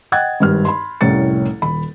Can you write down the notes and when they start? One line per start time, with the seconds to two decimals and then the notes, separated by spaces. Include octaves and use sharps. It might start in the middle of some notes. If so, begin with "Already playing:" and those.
0.12 D#5 F#5 G5 F#6 G#6 A6
0.40 G#1 G2 F6
0.65 B5 C6
1.01 F1 C2 A2 C#4 A6 C#7
1.62 D#1 B5